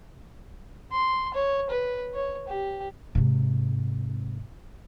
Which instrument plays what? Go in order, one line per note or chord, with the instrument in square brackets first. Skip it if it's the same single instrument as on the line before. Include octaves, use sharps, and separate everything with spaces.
[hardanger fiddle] C6
C#5
B4
C#5
G4
[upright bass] G#2 C3